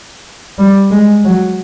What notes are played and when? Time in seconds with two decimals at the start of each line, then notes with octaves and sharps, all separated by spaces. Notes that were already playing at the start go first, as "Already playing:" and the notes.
0.58 G3
0.91 G#3
1.25 F#3